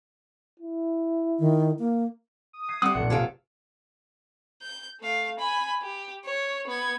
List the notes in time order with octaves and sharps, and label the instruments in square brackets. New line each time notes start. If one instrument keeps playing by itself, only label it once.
[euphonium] E4
[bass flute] D#3
A#3
[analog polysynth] D#6
[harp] G#6 C7 D#7
[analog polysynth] G3 G4 [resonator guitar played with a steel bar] C4 D4 [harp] F#5 [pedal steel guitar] D#6
[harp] F1 [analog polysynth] B1 A#2 [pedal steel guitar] F#5
[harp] C3 F4 D7 [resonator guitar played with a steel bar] G#4 A4 F5
[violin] G6
A3 F5
G#5 B5
G4
C#5
B3 G#6